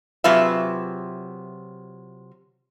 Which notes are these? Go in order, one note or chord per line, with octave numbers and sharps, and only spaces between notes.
C3 F#3 F4 G#4 B4 E5